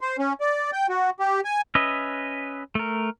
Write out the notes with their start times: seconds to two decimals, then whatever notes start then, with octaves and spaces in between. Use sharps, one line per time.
0.01 C5
0.19 C#4
0.41 D5
0.73 G5
0.89 F#4
1.20 G4
1.45 G#5
1.75 C#4 B4 D#5 E5
2.75 A3 A#4